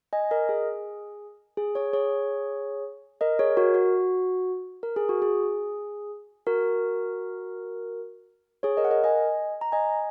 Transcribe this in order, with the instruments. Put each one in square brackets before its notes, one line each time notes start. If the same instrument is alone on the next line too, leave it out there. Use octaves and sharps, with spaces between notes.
[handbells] D#5 G#5
A#4 D#5
G#4
G#4
G#4 C#5
G#4 C#5
A#4 D#5
G#4 C#5
F#4 A#4
F#4
A#4
G#4
F#4
G#4
F#4 A#4
G#4 C#5
A#4 D#5
F#5
A#4 D#5
D#5 G#5
A#5
D#5 G#5